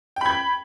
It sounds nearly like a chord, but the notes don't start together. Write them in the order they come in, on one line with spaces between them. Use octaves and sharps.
G5 B5 G#6